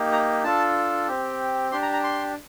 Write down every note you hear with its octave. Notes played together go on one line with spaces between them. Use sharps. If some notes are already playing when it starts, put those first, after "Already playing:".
Already playing: A#3 D#4 G4
A#5
D4 F4 A4 A5
C4 G4
D4 G4 C6
A#5
A#5
C6